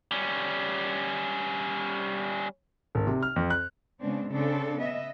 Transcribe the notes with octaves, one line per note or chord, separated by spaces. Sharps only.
G3 C#4
G#1
C3
F6
F2
F#6
C#3 G#3 B3 C4 D4
C#3 C4 D4 A4
B3 D#5 E5